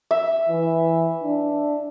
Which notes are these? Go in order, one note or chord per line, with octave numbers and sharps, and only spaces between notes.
E5
E3
D4